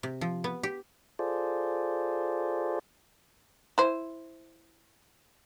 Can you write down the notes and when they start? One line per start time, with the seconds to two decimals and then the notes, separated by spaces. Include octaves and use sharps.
0.03 C3
0.21 F3
0.44 B3
0.63 G4
1.19 F4 G#4 A4 C5 D5
3.78 E4 C5